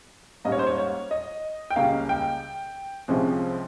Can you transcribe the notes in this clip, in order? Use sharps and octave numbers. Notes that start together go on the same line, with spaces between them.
G#2 G3 A#3 C#4 D#5
C#5
C5
C#5
C#5
D#5
G5
C#2 C#3 G3 A#3 C#4 F5
G5
C2 C3 F3 G#3 C#4